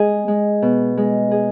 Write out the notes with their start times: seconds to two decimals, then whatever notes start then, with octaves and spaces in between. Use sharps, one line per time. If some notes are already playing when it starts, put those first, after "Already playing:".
Already playing: G#3 G#4
0.28 G#3
0.62 B2
0.97 G#3
1.31 G#4